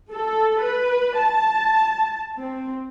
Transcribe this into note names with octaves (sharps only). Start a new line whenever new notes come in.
A4
B4
A5
C4